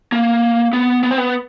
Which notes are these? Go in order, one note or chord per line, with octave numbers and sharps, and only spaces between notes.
A#3
B3
B3
C4
B3